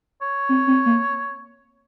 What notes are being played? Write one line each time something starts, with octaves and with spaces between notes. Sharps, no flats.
C#5
C4
C4
A#3